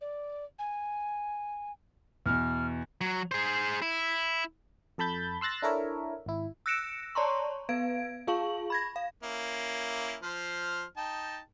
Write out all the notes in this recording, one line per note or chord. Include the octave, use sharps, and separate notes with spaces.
D5
G#5
E2 B2 F6
F#3
G#4 C5
E4
F2 A4 A5 B5 G6 A6
C6 E6 F#6 A6 A#6
D4 E4 A4 A#4 C#5 E5
G#1 E4
E6 F#6 A#6 C#7 D7 E7
C#5 D5 A5 A#5 C6 C#6
B3 B4 F5 G#6 D7
F4 G#4 F5 A5 C#6 F#7
B5 G#6 A#6
F5
A#3 C#4 E4
F3 C5 F6
D#4 G5 A5